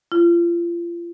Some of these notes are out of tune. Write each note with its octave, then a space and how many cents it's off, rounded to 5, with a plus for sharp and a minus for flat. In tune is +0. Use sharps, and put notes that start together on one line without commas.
F4 -35